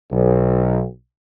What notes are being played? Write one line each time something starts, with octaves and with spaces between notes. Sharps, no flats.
B1